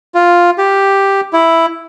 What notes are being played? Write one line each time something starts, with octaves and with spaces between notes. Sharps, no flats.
F4
G4
E4